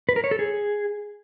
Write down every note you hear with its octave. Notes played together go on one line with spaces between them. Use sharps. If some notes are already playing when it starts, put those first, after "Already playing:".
B4
A#4
C#5
A4
G#4